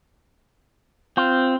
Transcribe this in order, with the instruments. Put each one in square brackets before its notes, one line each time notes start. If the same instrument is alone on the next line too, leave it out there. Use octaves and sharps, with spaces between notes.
[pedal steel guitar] C4 [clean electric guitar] F4